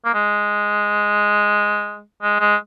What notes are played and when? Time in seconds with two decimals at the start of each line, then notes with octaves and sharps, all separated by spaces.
0.05 A#3
0.14 G#3
2.23 G#3
2.40 G#3